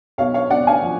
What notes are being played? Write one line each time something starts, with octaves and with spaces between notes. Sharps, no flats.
B1 C#5 F5
C#5 F5
B1 D5 F#5
F5 G#5
F3